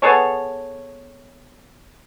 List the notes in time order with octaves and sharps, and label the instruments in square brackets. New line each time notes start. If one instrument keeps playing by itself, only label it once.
[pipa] B3 G#4 A4 C#5